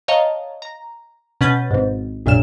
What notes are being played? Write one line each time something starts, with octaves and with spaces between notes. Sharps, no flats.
C#5 D#5 F5 A5 A#5
A#5
B2 C#4 B4 F#5 G6 A6
G#1 G#2
A#1 F#2 A#2 F6 E7